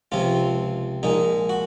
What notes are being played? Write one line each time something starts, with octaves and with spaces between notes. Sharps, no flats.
C#2 C3 F3 C4 F4
A#1 A#2 G#3 D#4
F#4